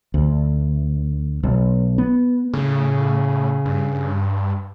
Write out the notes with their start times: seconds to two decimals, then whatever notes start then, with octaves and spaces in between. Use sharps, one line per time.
0.14 D2
1.43 B1
1.98 B3
2.54 A2 C#3
3.65 G2